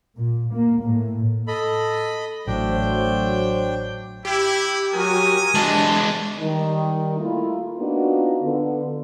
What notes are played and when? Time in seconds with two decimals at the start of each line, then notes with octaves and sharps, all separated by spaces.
0.16 A#2
0.53 A#3
0.83 A2
1.48 A4 D#5 B5
2.47 A1 F#3 A3 D4 C5 G5
4.25 E4 G4
4.94 F#3 A#4 G#5 D#6
5.55 E3 G#3 D4 A5
6.39 D#3 G3
7.18 A3 A#3 E4 F4
7.78 A#3 B3 D4 D#4 F4 F#4
8.43 D3 B3